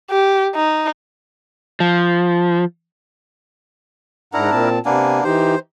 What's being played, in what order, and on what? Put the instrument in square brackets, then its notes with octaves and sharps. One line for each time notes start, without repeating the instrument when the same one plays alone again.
[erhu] G4
D#4
[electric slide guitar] F3
[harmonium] G#2 F#5 A#5 [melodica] D4 E4 A#4
[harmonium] A#2 C4 A5
[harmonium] C3 G#5 [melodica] A#3 B3 D4
[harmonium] E3 D#4 G4 [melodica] C5